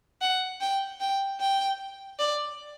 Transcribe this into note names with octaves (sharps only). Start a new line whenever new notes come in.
F#5
G5
G5
G5
D5